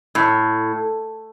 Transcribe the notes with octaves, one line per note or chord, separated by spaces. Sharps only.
A2